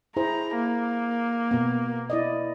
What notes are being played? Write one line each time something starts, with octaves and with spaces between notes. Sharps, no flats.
E4 G#4 C5 A#5
A#3
B2 B3
E4 D5 D#5